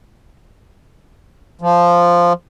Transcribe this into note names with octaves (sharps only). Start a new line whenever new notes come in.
F3